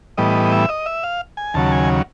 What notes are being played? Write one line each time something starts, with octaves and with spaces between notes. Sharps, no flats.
A2 E3 G3 B3 D#5
E5
D#5
E5
F5
G#5
D#2 C#3 F#3 A5
G#5